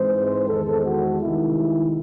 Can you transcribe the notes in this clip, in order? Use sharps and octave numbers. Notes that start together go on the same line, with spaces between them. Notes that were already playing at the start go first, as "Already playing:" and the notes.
Already playing: G#2 E3 G#3 C4 C5
E2 D#3 G#3 A4
F#4
C2 C3 D#3 G#3 E4